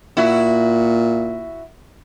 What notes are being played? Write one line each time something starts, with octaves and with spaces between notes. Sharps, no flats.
A#2 E4 F#4